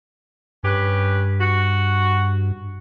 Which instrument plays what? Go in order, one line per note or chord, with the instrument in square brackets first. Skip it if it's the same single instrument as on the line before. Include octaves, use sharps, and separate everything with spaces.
[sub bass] G2 [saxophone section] C#4 G4 B4
[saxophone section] F#4